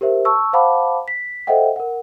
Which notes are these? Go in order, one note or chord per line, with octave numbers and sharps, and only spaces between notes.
G4 A#4 C5 E5
A5 C#6 E6
C5 F5 F#5 A5 B5 D6
B6
A4 C5 D#5 E5 F#5 G5
A#4 F#5